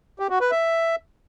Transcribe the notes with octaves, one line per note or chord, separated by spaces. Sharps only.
G4
F#4
B4
E5